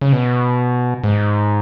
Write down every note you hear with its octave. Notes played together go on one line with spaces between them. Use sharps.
C#3
B2
G#2